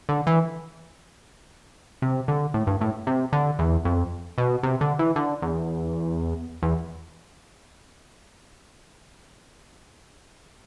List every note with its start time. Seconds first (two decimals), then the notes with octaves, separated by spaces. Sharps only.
0.09 D3
0.27 E3
2.02 C3
2.28 D3
2.54 A2
2.67 G2
2.81 A2
3.07 C3
3.33 D3
3.59 E2
3.85 F2
4.38 B2
4.63 C3
4.81 D3
4.99 E3
5.16 D3
5.42 E2
6.63 E2